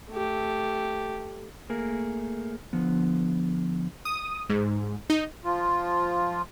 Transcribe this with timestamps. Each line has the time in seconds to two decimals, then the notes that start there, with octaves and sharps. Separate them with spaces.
0.11 A3 G4
1.69 A3 A#3 G#4 A#4
2.73 D3 F3 B3
4.05 D#6
4.49 G#2
5.10 D#4
5.45 F3 F4